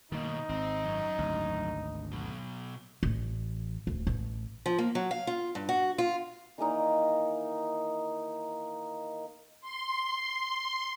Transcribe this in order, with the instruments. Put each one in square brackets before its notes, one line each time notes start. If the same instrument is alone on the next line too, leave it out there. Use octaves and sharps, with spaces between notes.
[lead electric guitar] G2 B2 [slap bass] D#3 A#3 [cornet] D#4
[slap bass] G#1 [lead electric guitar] C4
[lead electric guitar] F#2
[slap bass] G#1 D2
[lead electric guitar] B2 F#3
[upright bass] A1
D1
A1
[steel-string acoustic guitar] F3
A#3
F#3
F5
F4
G2
F#4
F4
[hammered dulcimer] D#3 E3 A#3 D#4
[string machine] C6